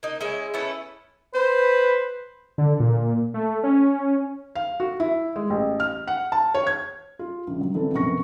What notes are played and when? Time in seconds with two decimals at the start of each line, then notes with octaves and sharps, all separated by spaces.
0.03 A#3 D#4
0.21 G#3 C#4 E4 E5
0.54 A3 B3 C#4 E4
1.35 B4 C5
2.58 D3
2.80 A#2
3.34 A3
3.64 C#4
4.55 F5
4.80 F#4
5.00 E4
5.36 G#3
5.50 A1
5.80 F6
6.07 F#5
6.32 A5
6.54 C#5
6.67 G#6
7.19 F4
7.47 A#1 C#3
7.61 F#3
7.74 D3 E3 C4 A4
7.92 A#1 F#2 C3 B3 C#6 A#6